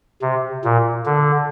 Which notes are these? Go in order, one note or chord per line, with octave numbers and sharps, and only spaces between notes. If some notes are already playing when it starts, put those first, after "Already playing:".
C3
A#2
D3